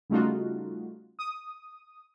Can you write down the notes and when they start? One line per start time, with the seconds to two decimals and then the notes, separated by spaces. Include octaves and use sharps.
0.10 C#3 G3 A3 D#4 F4 F#4
1.19 D#6